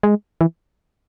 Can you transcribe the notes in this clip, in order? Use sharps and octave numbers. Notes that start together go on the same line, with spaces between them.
G#3
E3